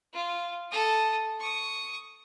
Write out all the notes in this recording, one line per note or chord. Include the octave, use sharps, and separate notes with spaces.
F4
A4 D#6
C#6 D#6